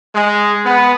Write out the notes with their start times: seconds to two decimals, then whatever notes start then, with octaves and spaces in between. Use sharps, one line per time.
0.15 G#3
0.65 B3